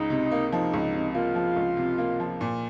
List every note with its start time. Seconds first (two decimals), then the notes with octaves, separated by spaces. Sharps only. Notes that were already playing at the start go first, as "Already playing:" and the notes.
Already playing: C#2 D#4
0.10 C3
0.31 A#3
0.52 F3 D#4
0.73 C#2
0.93 C3
1.15 A#3 F4
1.35 F3
1.56 C#2
1.77 C3
1.98 A#3
2.20 F3
2.41 A#2